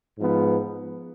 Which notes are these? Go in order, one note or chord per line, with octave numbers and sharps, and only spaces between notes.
G#2 F3 B3